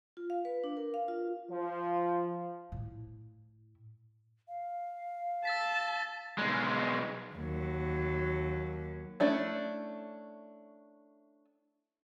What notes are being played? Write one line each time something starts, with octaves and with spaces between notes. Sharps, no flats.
F4
F5
B4
D4
A#4
F5
F4
F3
A2 E4
F5
A5 E6 A6 B6
B1 G#3
D#2 F#3
A3 C#4 D4 E4